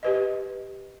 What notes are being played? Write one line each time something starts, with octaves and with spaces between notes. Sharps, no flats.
G4 B4 D#5